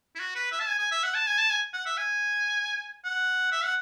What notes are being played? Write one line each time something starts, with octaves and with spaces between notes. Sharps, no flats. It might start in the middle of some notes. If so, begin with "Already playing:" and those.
E4
F#4
B4
E5
A5
G#5
G#5
E5
F#5
A5
G#5
A5
G#5
F#5
E5
G#5
F#5
E5
F#5